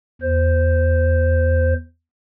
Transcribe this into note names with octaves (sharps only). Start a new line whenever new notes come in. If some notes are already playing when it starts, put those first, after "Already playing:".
E2 C5